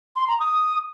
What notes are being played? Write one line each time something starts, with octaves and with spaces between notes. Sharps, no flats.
C6
A#5
D#6